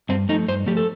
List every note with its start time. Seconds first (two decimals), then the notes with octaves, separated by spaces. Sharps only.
0.09 G2 C4
0.29 F3 A3 D#4
0.48 G2 C5
0.66 F3 A3 G4
0.77 A4